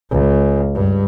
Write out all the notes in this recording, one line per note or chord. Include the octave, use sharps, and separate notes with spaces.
C#2
G2